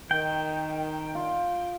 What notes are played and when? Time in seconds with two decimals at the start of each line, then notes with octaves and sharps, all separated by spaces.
0.11 D#3 G5
1.15 F4